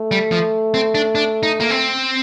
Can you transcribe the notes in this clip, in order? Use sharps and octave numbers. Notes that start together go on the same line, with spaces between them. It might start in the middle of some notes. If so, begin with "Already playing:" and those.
Already playing: A3
G3
F3
C4
D4
D4
D#4
A#3
C4